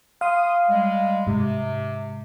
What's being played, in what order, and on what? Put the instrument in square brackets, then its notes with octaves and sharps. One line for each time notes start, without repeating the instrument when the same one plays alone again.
[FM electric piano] F5 [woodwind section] C6 D#6
[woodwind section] G3 G#3
[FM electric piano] G#2 [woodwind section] C3